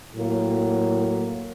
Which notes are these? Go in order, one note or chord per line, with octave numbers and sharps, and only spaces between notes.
A2 F#3 A#3